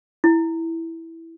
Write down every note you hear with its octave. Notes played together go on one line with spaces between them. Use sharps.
E4